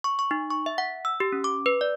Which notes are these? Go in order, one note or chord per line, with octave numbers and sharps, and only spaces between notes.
C#6
C#6
D#4
C#6
E5
F#5
E6
G4
C#4
D6
B4
D5